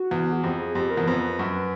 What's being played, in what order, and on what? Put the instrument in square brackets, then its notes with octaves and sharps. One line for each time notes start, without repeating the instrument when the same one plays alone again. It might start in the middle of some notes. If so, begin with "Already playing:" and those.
Already playing: [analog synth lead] F#4
[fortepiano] E2
[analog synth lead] G#4
[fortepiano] F2 [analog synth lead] G4
[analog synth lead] G#4
[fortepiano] F2 [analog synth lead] G4
[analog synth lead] A#4
[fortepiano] E2
[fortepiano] F2 [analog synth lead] B4
[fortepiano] F#2